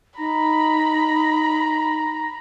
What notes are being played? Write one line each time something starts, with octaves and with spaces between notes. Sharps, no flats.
D#4 A#5 B5